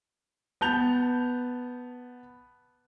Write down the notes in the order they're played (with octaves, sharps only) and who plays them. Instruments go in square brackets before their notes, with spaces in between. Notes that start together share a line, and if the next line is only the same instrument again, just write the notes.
[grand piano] B3 A5 G6 F7